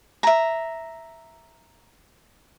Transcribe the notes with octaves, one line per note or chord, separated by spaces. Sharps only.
E5 A#5